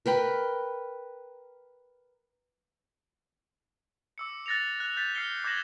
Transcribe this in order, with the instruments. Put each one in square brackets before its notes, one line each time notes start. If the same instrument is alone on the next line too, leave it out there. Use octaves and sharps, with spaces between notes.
[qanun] A#4 B4 G5 B5
[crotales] D6 E6 C#7
F#6 A6 A#6 C#7 F7
F#6 F7
G6 A6 B6
F6 C7 C#7 G7
D6 G6 G#6 A#6 E7 F#7